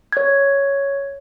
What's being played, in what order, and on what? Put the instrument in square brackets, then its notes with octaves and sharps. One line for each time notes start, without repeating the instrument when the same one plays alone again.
[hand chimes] C#5 G#6